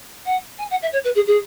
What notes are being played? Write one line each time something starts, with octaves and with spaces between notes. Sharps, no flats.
F#5
G#5
F#5
E5
C#5
B4
G#4
G#4